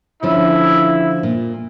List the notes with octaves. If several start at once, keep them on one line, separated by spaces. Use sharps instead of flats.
D3 F3 C#4 E4
A#2